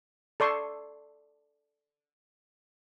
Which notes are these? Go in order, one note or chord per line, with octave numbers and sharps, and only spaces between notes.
A4 D5 C6 C#6